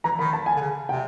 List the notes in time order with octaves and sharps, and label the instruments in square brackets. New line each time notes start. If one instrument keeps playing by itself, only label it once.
[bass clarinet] E3 [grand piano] A#5
[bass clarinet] D#3 [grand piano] B5
[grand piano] A5
G#5
[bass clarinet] D3
C#3
[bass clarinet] C3 [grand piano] G5